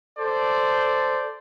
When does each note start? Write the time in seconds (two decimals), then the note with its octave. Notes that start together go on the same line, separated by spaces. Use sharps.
0.18 A4 C5 D5